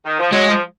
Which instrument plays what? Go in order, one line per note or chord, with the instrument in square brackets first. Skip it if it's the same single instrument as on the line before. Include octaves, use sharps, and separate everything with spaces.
[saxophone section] D#3
F3
[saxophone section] F#3 [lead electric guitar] G#3
[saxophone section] F3